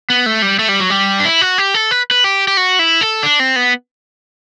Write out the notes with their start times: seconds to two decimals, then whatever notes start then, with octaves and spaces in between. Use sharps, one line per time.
0.10 B3
0.26 A3
0.42 G3
0.59 A3
0.69 G3
0.80 F#3
0.90 G3
1.20 D4
1.25 E4
1.41 F#4
1.58 G4
1.74 A4
1.91 B4
2.11 B4
2.24 G4
2.48 G4
2.57 F#4
2.79 E4
3.01 A4
3.23 D4
3.40 C4
3.56 B3